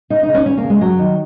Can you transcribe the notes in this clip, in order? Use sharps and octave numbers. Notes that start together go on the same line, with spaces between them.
C#3 D#4
D#4
C#3
C#4
E2 C#4
A#3
C#3
G#3
F#2 F#3
D#3